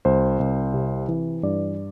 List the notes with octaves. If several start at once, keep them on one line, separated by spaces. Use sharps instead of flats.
C2 C5
C2
C3
E3
G2 D5